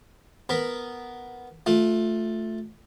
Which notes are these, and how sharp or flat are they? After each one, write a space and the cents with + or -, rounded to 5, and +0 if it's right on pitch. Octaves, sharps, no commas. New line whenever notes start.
B3 +0 A#4 +0 B5 +0
A3 +0 F4 +15